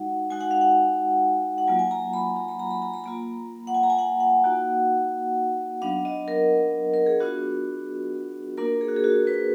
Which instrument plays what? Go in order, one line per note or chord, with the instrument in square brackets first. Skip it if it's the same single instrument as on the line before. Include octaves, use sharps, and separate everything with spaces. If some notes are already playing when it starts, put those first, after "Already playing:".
Already playing: [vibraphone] G#3 D#4 F#4 F#5
G#3 D#4 F#4 G#5
F#5
F5
F#5
F#5
F#3 A#3 F4 G#5
G#5
A#5
B5
A#5
B5
A#5
B5
A#5
B5
A#3 F4 A#5
F#5
G#5
A#5
G#5
F#5
F#5
A#3 D#4 F#4
F#3 B3 D4 F5
D#5
A#4
A#4
G#4
B3 D4 F4 F#4
A#3 D4 F4 A#4
G#4
F#4
G#4
F#4
B4